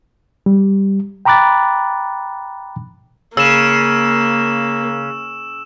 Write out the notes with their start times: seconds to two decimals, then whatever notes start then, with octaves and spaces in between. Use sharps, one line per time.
0.46 G3
1.25 G5 A#5 B5 D6 F#6 A6
3.37 C#3 A#3 E6 E7